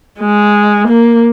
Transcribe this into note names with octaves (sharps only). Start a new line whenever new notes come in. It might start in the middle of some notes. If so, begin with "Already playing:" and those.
G#3
A#3